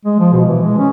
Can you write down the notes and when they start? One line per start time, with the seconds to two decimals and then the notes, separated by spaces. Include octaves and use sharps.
0.05 G#3
0.19 F3
0.32 B2
0.48 E3
0.62 G#3
0.78 C#4